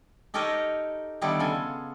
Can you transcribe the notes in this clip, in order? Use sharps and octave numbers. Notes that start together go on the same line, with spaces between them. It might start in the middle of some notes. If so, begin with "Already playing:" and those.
D#4 G4 A4 A#4 C#5 D#5
D3 D#3 G3 B3 E4 A4
C#3 F4 A4 G#5